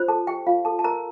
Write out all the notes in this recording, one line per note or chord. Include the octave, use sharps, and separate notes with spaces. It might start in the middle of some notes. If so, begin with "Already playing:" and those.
Already playing: F4 C5
A4 A5
G4 G5
F4 F5
A4 A5
A5
A#4 A#5